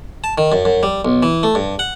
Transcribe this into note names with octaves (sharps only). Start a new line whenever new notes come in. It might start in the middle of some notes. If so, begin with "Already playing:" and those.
A5
D#3
F#2
F#2
G3
B1
E3
A3
G2
F#5